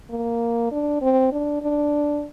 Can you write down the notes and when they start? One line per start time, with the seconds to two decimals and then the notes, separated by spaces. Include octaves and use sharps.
0.10 A#3
0.71 D4
1.01 C4
1.32 D4
1.62 D4